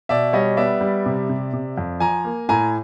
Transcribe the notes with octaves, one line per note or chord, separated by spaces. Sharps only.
B2 D5 E5
G3 C#5 D#5
B3 D5 E5
G3
C3
C3
C3
F2
F3 G#5 A#5
A#3
A2 G#5 A#5